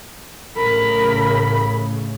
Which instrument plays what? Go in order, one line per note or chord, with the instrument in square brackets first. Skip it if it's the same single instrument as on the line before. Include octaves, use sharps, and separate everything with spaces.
[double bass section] A1 A2 C#3 [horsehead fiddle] A#4 B5